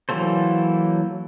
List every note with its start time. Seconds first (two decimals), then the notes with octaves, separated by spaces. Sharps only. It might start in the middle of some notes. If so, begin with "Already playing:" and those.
0.09 E3 F#3 A#3 A4 C5